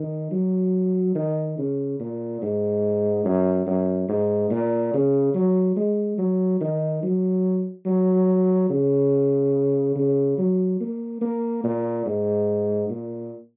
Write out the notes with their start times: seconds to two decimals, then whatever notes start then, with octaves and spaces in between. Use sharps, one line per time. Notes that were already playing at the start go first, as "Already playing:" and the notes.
Already playing: D#3
0.31 F#3
1.15 D#3
1.58 C#3
1.99 A#2
2.42 G#2
3.25 F#2
3.67 F#2
4.09 G#2
4.50 A#2
4.93 C#3
5.34 F#3
5.76 G#3
6.18 F#3
6.61 D#3
7.03 F#3
7.86 F#3
8.70 C#3
9.96 C#3
10.38 F#3
10.80 A#3
11.21 A#3
11.64 A#2
12.06 G#2
12.90 A#2